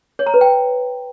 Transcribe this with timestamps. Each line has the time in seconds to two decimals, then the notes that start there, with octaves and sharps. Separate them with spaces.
0.19 C#5
0.26 A#5
0.34 B4
0.41 G5